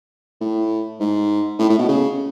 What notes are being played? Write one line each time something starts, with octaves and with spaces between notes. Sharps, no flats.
A2
G#2
A2
A2
B2
C#3